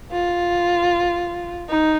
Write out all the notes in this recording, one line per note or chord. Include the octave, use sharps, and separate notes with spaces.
F4
D#4